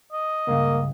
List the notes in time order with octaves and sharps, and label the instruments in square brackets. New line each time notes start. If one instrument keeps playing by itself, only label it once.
[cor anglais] D#5
[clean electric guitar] C#2 G2 C#3 [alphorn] A#3